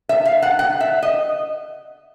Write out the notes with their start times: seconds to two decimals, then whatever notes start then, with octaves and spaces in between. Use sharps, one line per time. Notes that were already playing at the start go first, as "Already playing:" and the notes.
0.09 E5
0.26 F5
0.42 F#5
0.59 F#5
0.80 E5
1.03 D#5